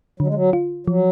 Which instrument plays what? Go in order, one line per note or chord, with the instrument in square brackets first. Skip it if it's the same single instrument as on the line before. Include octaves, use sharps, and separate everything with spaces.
[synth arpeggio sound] D3 [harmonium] F#3
[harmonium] G#3
F#3
[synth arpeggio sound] F4
[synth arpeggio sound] F3 [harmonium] F#3